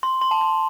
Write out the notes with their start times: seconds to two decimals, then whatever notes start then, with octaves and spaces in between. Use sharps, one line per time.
0.03 C6
0.21 C6
0.31 A5
0.41 C6